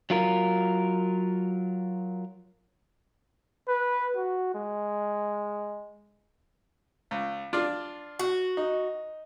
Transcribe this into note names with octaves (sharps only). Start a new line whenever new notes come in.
F#3 F4 A#4
B4
F#4
G#3
C#2
D4 F4 D5
F#4
D#4